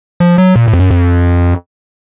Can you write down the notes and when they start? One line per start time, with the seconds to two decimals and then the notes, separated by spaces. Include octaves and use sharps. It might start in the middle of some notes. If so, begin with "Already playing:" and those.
0.20 F3
0.38 F#3
0.56 A#2
0.68 A2
0.73 F2
0.79 F#2
0.91 F2